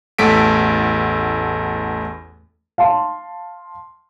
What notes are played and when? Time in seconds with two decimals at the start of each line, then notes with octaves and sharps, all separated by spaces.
0.18 A1 E2 A3 A4 B6 D7
2.78 F5 A5 C6